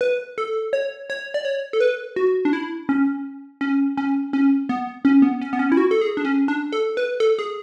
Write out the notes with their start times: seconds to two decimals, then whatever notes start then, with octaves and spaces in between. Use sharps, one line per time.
0.01 B4
0.38 A4
0.73 C#5
1.10 C#5
1.34 D5
1.45 C#5
1.73 A4
1.80 B4
2.16 F#4
2.45 D4
2.53 E4
2.89 C#4
3.61 C#4
3.97 C#4
4.33 C#4
4.69 B3
5.05 C#4
5.22 B3
5.41 C#4
5.53 B3
5.59 C#4
5.72 E4
5.77 F#4
5.91 A4
6.01 G#4
6.17 D4
6.25 C#4
6.48 D4
6.72 A4
6.97 B4
7.20 A4
7.39 G#4